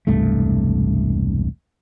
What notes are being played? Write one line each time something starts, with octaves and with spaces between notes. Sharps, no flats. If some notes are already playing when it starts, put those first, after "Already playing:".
E1 C2 G2 A3